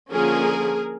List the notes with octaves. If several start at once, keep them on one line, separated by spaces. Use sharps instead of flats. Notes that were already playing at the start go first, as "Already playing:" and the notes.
D3 F3 A#3 C#4 G#4 A#4